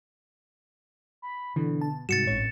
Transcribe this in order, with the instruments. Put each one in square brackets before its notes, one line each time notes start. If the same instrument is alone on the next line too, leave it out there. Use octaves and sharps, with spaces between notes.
[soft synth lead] B5
[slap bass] B2 [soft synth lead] D3 [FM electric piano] E3
[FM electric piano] A5
[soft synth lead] G#2 [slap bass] C3 G3 [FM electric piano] F#4 [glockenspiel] A6 C#7 E7
[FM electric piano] A1 C#5 [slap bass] A2 C4 C#4